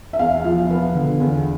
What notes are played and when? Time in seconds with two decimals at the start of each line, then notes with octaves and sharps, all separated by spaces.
0.13 E5
0.19 E2 F5
0.44 F3
0.70 B3
0.95 D3
1.20 E2